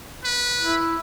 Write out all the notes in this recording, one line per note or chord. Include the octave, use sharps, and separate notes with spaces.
B4
E4